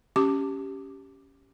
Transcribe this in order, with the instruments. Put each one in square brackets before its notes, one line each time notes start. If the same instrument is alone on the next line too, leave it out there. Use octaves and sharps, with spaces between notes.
[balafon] C#4 G4 D6